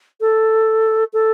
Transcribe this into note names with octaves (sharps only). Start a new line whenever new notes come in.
A4
A4